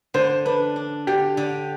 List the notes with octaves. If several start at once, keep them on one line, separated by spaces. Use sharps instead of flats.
D3 C5
D4 B4
D4
D3 G4
D3